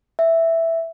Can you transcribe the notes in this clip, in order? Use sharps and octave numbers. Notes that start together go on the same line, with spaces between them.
E5